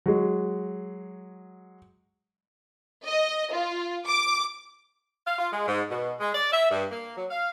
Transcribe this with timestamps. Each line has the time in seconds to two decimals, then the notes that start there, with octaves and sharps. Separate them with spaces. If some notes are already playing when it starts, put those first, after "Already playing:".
0.06 F#3 G#3
3.06 D#5
3.53 F4
4.08 D6
5.26 F5
5.38 F4
5.52 G#3
5.68 G#2
5.90 B2
6.19 G#3
6.34 D5
6.51 E5
6.71 G2
6.91 A#3
7.17 F#3
7.30 F5